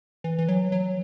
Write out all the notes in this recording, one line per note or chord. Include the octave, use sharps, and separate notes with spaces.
E3
E3
F#3
F#3